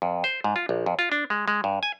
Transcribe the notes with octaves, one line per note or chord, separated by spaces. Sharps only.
F2
C5
G#2
F4
A#1
F2
F4
D4
G#3
G#3
G2
G#5